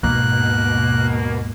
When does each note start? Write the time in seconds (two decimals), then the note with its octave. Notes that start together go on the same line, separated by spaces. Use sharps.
0.03 D#2 G#2 B2 A#3 F#6